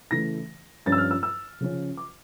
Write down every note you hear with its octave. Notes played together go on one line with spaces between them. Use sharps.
C#3 E3 A3 A#6
G2 F3 C#4 A6
E6
F6
E6
E6
C#3 F3 C#4
D6